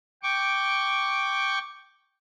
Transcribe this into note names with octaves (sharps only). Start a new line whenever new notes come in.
G5 C#6 D6